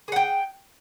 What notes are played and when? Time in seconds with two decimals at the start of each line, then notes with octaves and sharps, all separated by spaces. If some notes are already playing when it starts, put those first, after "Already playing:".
0.08 G#4
0.12 F#5
0.16 G5